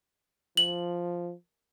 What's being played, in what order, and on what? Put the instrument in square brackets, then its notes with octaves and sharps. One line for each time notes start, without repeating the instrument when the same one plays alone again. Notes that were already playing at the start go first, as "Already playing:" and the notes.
[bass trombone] F3 [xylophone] F#7